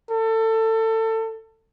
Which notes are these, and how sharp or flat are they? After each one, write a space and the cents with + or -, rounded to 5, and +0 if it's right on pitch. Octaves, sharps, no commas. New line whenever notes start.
A4 +25